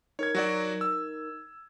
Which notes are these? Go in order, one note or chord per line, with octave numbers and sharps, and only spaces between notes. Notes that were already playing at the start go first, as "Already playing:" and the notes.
D#4 A#4 C#5 G#6
F#3 F#4 D5
E6